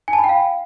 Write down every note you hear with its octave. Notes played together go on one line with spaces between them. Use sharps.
G#5
A5
B5
G5
F5